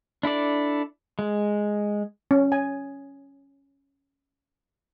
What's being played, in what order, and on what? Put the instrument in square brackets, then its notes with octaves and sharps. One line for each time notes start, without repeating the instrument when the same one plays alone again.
[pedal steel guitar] D4 E4 A4 D5
G#3
[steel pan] C#4
G#5